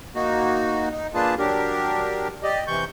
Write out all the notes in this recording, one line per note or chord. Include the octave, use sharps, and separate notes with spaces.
A#3 D#4 F#4
D#4
A#3 D4 F4 G#4 B4 A5
F#3 D4 G4 A#4
G4 D5 D#5
C3 E3 C#6 G6